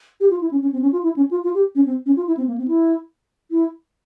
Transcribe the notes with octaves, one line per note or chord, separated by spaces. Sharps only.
G4
F4
E4
C#4
C#4
C4
C#4
F4
E4
C#4
F4
F4
G4
C#4
C4
C#4
F4
E4
C4
A#3
C4
E4
E4